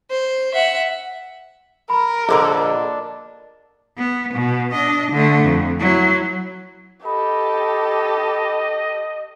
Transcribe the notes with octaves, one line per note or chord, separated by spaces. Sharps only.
C5
E5 F#5
A#4 B5
A#1 D3 A#3 D4 A4 D#5
B3
B2
D4 D#5
D3 A3
F2
F#3 E4
G4 A4 D#5 B5